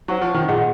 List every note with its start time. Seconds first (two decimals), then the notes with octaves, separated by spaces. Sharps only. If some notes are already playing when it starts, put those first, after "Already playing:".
0.08 F#3 C5 F#5 C#6
0.22 F3
0.34 D#3
0.48 A#2 G#4 D#5 F#5